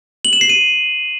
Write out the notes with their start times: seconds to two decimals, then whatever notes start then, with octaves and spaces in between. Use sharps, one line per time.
0.25 F#7
0.33 E7
0.41 C7
0.49 D#7